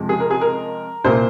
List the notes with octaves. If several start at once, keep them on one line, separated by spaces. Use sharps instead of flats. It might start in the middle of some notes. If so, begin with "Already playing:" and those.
Already playing: F2 C3 F3 G#3
G#4
A#4
G#4
A#4
C2 A#2 A#3 C5